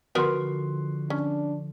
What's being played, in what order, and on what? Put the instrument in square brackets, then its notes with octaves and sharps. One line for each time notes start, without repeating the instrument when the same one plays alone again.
[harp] D3 F3 [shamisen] B3 A#4 B4 [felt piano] F#4 C6
[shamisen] C#4 [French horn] D4